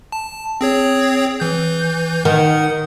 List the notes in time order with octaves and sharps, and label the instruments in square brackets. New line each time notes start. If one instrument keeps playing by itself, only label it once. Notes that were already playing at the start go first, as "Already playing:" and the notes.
[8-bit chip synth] A5
C4 G#4 C#5
E3 G6
[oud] D#3 [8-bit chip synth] F#5